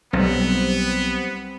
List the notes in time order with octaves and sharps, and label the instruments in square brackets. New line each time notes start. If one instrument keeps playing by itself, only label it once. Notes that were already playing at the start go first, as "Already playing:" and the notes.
[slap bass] B1 [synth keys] G3 C4 [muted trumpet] B3